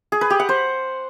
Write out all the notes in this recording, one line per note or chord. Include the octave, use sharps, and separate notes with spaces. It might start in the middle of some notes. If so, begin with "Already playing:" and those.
G#4
B4
G4
F#5
C5